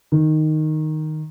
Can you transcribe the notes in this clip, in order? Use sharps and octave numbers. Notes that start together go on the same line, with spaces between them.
D#3